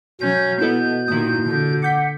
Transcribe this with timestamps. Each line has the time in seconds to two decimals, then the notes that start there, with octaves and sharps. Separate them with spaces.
0.21 B2 F#3 C#4 G6
0.61 B3 E4 A4 D#5
1.08 A#2 D#3 E4 D#6
1.48 D3
1.82 F#5 D6 G6 B6